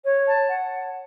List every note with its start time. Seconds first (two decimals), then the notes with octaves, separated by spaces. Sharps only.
0.04 C#5
0.27 A5
0.49 F#5